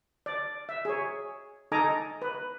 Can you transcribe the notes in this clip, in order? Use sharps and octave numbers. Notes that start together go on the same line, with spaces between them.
D5
E5
G#4 C#5
D#4 A4 D#5 G#5 A#5 D6
B4